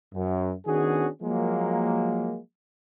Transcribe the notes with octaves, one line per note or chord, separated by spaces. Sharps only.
F#2
D#3 B3 C#4 D4 F#4 G#4
F3 F#3 G#3 A#3